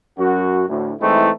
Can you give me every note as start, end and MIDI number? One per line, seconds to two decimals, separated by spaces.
0.18 0.63 42
0.18 0.63 66
0.69 0.93 38
0.69 0.93 45
1.01 1.30 52
1.01 1.30 56
1.01 1.30 57
1.01 1.30 60
1.01 1.30 63
1.01 1.30 64